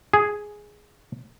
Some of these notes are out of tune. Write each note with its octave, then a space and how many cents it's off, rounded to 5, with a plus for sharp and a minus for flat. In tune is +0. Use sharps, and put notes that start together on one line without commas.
G#4 +0